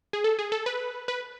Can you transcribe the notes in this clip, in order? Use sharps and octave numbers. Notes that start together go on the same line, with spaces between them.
G#4
A4
G#4
A4
B4
B4